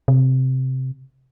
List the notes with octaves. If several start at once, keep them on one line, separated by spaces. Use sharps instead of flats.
C3